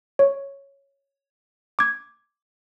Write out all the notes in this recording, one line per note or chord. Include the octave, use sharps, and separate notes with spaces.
C#5
D6 G#6